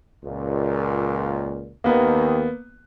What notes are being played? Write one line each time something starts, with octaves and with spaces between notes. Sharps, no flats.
C#2 A#2
D#2 D#3 A#3 B3